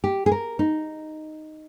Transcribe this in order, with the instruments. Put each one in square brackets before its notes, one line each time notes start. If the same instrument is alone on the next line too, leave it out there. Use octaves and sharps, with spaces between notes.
[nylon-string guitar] G4
G#4
A#4
D#4